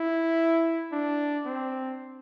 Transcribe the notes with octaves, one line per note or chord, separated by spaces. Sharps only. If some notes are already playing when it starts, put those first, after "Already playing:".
Already playing: E4
D4
C4